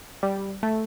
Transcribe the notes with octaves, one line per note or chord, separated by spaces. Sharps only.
G3
A3